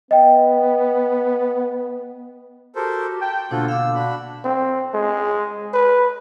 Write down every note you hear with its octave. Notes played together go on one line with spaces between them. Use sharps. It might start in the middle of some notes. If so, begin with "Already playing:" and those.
B3 D#5 G5
F#4 G4 A4 A#4 C5
G5 A5
B2 D3 A#3 D4 F4 F#4 A4 C5
F5 D6 E6
D4 F#4 B5
C4
G#3
B4